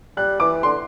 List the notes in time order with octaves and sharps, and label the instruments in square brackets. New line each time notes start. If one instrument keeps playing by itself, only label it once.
[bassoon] G3 [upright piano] F#6
[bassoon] E3 [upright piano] D6
[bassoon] D3 [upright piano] C6